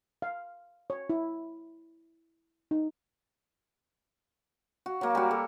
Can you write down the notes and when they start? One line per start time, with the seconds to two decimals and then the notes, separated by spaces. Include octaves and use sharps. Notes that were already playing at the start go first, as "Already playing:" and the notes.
0.22 F5
0.90 C#5
1.10 E4
2.71 D#4
4.86 F#4
5.01 F#3 A#3
5.15 G3 F#4
5.31 A4